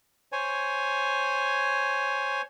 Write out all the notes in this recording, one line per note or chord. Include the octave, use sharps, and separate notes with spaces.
C5 C#5 G#5